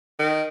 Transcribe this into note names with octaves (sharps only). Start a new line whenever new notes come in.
D#3